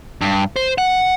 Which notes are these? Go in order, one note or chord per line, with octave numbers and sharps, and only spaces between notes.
G2
C5
F#5